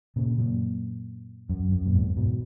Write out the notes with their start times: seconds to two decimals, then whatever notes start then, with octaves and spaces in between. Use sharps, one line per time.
0.16 A#2 C#3
0.38 F#2 A#2
1.49 F#2
1.71 F#2
1.86 A#2
1.94 E2 G#2
2.17 G#2 B2